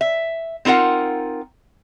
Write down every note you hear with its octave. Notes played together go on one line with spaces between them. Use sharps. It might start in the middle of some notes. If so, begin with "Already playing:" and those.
E5
C4 D#4 F4 A#4 F#5